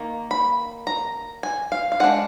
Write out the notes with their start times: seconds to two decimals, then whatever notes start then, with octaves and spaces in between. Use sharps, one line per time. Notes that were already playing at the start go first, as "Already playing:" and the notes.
Already playing: D#3 A#3
0.31 B5
0.87 A#5
1.43 G#5
1.72 F5
1.92 F5
2.00 G#3 D4 F#5